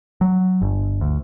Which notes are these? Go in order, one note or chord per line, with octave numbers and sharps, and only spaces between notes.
F#3
G1
D2